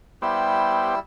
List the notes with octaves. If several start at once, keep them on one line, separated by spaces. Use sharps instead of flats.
G3 B3 E4 G4 C5 E6